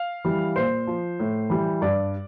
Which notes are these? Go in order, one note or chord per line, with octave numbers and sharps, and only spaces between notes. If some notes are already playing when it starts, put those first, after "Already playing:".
Already playing: F5
E3 G3
A#2 C5
F3
A2
E3 G3
G2 D5